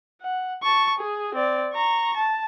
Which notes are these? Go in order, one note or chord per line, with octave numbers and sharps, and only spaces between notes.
F#5
A5 C#6
G#4
C4 D5
A#5 C#6
A5